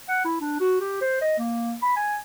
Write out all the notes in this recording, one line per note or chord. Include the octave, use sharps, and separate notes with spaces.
F#5
E4
D4
F#4
G4
C5
D#5
A#3
B5
G#5